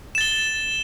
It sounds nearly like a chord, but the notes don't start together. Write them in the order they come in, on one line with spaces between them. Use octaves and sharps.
E7 A6 G7